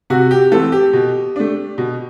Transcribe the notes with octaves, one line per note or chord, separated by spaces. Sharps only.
C3 F#4
G4
E3 A3 C4 A4
G4
B2
A3 D4
B2